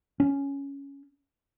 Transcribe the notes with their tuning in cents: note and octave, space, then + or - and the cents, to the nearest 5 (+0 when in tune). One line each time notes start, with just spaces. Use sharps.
C#4 +5